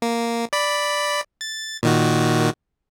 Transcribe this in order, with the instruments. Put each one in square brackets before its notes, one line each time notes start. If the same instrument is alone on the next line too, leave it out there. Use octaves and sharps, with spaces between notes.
[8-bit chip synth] A#3
D5 B5
A6
A#2 D#3 F#4